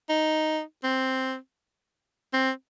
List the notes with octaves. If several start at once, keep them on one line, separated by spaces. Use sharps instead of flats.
D#4
C4
C4